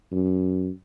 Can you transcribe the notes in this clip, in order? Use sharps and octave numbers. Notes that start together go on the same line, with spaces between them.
F#2